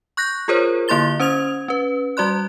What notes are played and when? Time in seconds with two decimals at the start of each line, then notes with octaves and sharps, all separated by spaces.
0.17 C#6 F#6 G6 A#6
0.48 F4 G#4 A#4 C5 C#5
0.88 D3 A#3 E4 C6 A6 G7
1.20 C#4 C5 D#6 G#6 F7
1.68 C#4 B4
2.17 G3 F#4 D5 C6 F#6